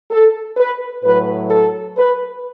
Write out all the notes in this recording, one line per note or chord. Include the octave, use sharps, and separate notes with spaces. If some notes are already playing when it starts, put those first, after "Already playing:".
A4
B4
A2 F#3 B4
A4
B4